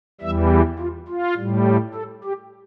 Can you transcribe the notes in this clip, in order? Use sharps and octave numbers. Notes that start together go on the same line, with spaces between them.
E2 E3 G3 E5
F4
F4
A2 G3
A4
G4